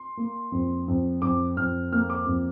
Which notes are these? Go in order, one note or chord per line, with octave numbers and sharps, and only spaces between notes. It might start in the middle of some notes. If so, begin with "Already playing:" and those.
Already playing: C6
A#3
F2
F2
F2 D6
F2 F6
A#3 F6
D6
F2